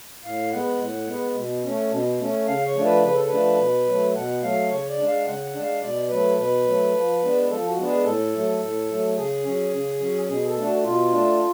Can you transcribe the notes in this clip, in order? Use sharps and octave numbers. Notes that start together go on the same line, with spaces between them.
A2 F5
G#3 B3 F#5
A2
G#3 B3
B2
A3 C#4
B2
A3 C#4
C#3 F5
C#5
F3 A3 D4
B4
C#3 B4
A4
F3 A3 D4 B4
B2
F#3 A3
B2 F#5
F#3 A3 F5
C#3 C#5
D5
G#3 D4
F5
C#3 F#5
F#5
G#3 D4
F5
B2 D5
F#3 A3 B4
B2 B4
F#3 A3
F3
G#3 B3 D4
F3 A4
F#4
G#3 B3 D4
G#4
A2 A4
F#3 A3
A2
F#3 A3
C#3 G#4
F#3 C#4
C#3
F#3 C#4
B2 G#4
A4
A3 D4
F#4
B2 F4
A3 D4